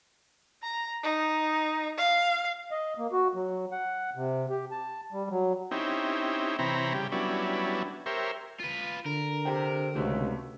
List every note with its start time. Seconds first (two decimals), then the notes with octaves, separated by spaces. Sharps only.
0.63 A#5
1.03 D#4
1.98 F5
2.71 D#5
2.98 A#3
3.12 F#4
3.35 F#3
3.72 F#5
4.16 C3
4.50 G4
4.71 A5
5.12 G3
5.30 F#3
5.71 C4 C#4 D#4 E4 G4
6.59 C3 E3 C4 C#5 A#5 B5
6.94 C#3 G3 G4
7.12 F#3 G3 B3 C#4 D4 E4
8.06 G4 A#4 C5 C#5 E5
8.60 F4 B4
9.06 D3 A#4
9.45 G4 C5 G5
9.95 C#2 C3 A3 F#4 A4